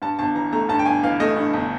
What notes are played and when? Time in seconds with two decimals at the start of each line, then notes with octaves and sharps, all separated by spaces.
0.02 G2 A5
0.19 G1 A5
0.35 E3 A#5
0.53 A3 A#5
0.69 G2 A5
0.79 G5
0.86 G1 G#5
1.03 E3 F5
1.20 A3 D#5
1.36 G2
1.53 G1